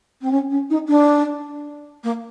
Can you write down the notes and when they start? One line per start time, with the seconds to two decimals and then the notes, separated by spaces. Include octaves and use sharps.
0.21 C4
0.31 C#4
0.50 C#4
0.70 D#4
0.88 D4
2.03 A#3